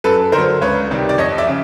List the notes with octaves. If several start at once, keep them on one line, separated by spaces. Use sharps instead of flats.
F#2 A4 B4
D3 A#4 C5
F#3
C#2 B4 C#5
C3 D#3 G3
D5
F2 C#5 D#5
D5 E5
C#3